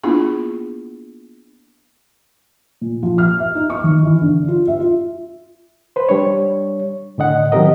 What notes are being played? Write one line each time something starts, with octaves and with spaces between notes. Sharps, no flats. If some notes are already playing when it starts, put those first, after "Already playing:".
A#3 B3 D4 E4 F4 G#4
A#2
F3
F6
E5
D#4
C#6
D#3
E3
D3
F4
E5
F4
B4 C5
G3 D4 C#5
A2 D3 D#5 F#5
D#3 F#3 C4 G4 A#4 D#5